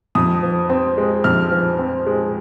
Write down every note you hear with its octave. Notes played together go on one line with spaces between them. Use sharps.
F2 D#6
F3
C4
G#3
F2 F6
F3
C4
G#3